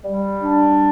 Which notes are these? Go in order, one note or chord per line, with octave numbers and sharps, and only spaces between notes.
G3
D4